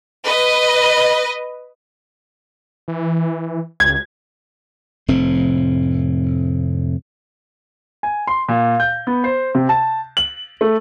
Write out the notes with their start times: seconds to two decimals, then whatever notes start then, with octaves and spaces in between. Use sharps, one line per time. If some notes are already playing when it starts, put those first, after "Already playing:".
0.24 B4 D#5
2.88 E3
3.80 C#2 G#6
5.08 F1 A2 C4
8.03 G#5
8.27 C6
8.48 A#2
8.80 G6
9.07 B3
9.24 C5
9.55 C3
9.69 A5
10.17 F#7
10.61 A3